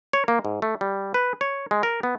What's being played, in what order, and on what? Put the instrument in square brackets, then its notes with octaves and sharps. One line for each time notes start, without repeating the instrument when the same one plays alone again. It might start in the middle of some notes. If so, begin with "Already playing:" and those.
[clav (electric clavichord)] C#5
A#3
G#2
A3
G3
B4
C#5
G#3
A#4
B3